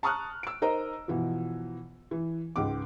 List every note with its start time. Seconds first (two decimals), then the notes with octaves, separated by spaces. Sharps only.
0.03 A5 A#5 C#6 D#6 F6 F#6
0.43 E6 D7
0.62 D#4 A#4 C5 D#5 A#5
1.08 B2 E3 F3
2.11 E3
2.56 C#2 G#2 D6